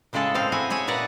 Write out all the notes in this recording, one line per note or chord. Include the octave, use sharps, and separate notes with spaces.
A2 C#3 G#3 G#4 A4
C4 F5
E4 F#4 G#5
G#4 C#5 E5 G#5
A#2 B4 D5 F#5 A#5